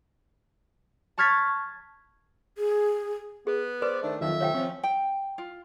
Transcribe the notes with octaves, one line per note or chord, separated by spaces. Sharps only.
A5 C#6 F6 G#6 A6 B6
G#4
B3 G#4
B4 C5 D5
D#3 A3 D4
F2 D#3 F#3 F4 E5
C3 A3 C#5 F5 G5
F3 C4 C#4
G5
F4